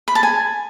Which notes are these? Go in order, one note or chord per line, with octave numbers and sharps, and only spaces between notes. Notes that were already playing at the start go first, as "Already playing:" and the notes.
B5
A5
G#5